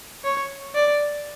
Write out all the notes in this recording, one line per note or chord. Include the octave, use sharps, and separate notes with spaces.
C#5
D5